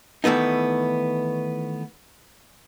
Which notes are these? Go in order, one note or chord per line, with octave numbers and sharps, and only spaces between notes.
D#3 E3 A3 B3 D#4